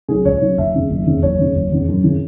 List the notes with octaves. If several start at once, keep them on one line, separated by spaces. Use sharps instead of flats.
C#3 F#3 C#4 G#4
C#2 C#5
C#3 F#3 C#4
F#1 E5
E2 C#3
F#1
E2 C#3
F#1 C#5
E2 C#3
F#1
E2 C#3
F#2
C#3 E3